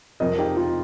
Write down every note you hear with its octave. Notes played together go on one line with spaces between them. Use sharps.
F2 C3 F3 A#4 D#5
D#4 G4
F4